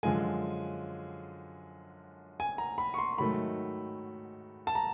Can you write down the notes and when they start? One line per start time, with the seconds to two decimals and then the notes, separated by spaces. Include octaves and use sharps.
0.03 F#2 D3 F3 G#3 G#5
2.40 G#5
2.58 A#5
2.78 B5
2.94 C#6
2.98 C6
3.18 G#2 D#3 F#3 A3 B5
4.67 A5
4.75 A#5